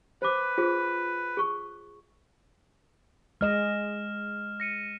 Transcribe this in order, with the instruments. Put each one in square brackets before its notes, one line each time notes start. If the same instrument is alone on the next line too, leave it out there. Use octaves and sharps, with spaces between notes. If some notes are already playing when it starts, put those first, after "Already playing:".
[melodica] B4 [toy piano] C5 D6
[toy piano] F4 G#4 C5
G#4 C#6
[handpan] G#3 D#5 [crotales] F6 E7
[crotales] A#6 C#7 D#7